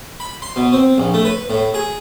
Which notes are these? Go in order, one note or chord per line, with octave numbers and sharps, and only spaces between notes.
B5
C6
B2
C4
A#1
A3
B4
A2
G#4